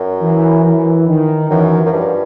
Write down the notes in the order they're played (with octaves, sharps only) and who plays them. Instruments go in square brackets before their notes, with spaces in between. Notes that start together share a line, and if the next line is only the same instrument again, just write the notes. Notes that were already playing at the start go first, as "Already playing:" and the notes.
Already playing: [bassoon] F#2
[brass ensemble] E3
E3
D#3
[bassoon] F#2 [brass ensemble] E3
[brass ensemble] F3
[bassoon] F#2
G2